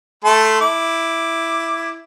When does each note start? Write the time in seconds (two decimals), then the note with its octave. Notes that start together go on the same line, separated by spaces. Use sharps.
0.24 A3 A4 C6
0.61 E4 D6